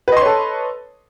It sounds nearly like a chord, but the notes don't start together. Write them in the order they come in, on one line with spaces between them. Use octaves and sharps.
B4 D#5 C6 C#5 A4